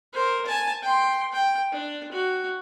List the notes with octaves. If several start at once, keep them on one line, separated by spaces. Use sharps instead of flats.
A#4 C5
G#5 A5
G5 C6
G5
D4
F#4